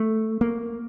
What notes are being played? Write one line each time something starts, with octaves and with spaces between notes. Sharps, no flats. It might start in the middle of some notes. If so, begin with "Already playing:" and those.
Already playing: A3
A#3